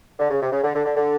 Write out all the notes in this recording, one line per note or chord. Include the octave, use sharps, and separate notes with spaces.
D3
C#3
C3
C#3
D3
D3
D3
D3